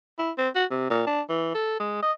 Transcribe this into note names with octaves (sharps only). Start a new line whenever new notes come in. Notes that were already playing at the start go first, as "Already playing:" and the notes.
E4
C4
F#4
C3
A#2
D4
E3
A4
G#3
D#5